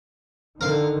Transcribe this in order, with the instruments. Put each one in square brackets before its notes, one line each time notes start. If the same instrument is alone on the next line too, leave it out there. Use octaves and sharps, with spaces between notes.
[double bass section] D3 D#3 [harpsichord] A#4 F5